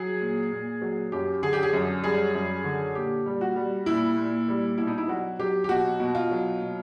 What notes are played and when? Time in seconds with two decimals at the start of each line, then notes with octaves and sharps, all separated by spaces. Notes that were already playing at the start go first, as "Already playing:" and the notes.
Already playing: F#3 G#4
0.21 A#2
0.51 A#2
0.82 F#3
1.12 F#2 G4
1.43 D3 G#4
1.53 G4
1.63 G#4
1.73 F#2
2.03 G3 G#4
2.35 F#2
2.64 D3
2.95 A#2 G4
3.26 G3
3.41 F#4
3.56 G3
3.86 A#2 E4
4.17 A#2
4.48 G3
4.78 B2 E4
4.87 D#4
4.98 E4
5.08 F#3 F#4
5.39 F#3 G4
5.64 G4
5.69 B2 F#4
6.00 B2
6.15 F4
6.31 F#3
6.62 B2